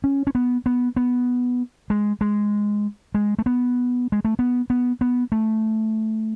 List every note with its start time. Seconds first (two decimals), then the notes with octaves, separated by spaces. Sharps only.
0.04 C#4
0.27 C#4
0.35 B3
0.66 B3
0.96 B3
1.90 G#3
2.21 G#3
3.14 G#3
3.39 A3
3.46 B3
4.12 G#3
4.25 A3
4.39 B3
4.70 B3
5.01 B3
5.32 A3